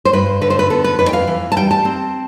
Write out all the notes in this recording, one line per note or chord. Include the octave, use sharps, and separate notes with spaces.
C5
G2 B4
D3 B4
C5
B4
B3 A4
B4
F2 B4
G5
F5
E3
A5
G3 G5
A5
C4